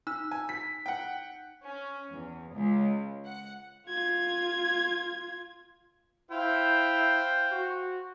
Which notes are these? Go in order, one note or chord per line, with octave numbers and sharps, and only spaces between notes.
D#4 E6
G#5
B6
F#5 G5
C#4
E2
C#2
F#5
F4 G#6
E4 C5 F5 G5
F#4